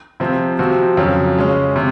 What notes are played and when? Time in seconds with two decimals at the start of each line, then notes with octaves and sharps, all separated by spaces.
0.20 C3 F3 C4
0.59 C3 F3 C4 F#4
0.97 F2 C#3 F#3
1.37 C#3 G#3 C#4
1.76 C3